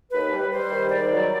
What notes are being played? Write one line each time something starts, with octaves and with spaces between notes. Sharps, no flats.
D#2 B4
G3
G3 C5
D#3
G#2 D5
F#3